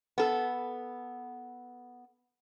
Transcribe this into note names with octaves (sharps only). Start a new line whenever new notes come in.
B3 A4